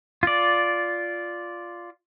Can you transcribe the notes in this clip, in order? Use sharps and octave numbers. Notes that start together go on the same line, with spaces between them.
F4 D5